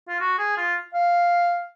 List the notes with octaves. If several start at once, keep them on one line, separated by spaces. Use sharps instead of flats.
F4
F#4
G#4
F4
F5